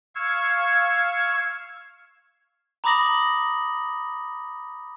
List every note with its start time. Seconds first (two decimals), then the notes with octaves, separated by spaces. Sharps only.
0.15 F5 C#6 E6 G#6
2.84 A#5 B5 D6 D#6 A#6 F#7